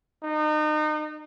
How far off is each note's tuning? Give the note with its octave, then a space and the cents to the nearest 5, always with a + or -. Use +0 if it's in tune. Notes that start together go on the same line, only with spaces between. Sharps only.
D#4 -30